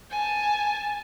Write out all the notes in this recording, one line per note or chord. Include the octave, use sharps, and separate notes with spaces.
G#5 A5